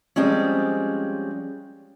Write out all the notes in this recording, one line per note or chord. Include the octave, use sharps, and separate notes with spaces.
F3 G3 G#3 C4 C#4